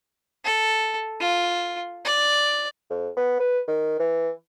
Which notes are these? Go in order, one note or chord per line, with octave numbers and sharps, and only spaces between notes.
A4
F4
D5
F2
B3
B4
D#3
E3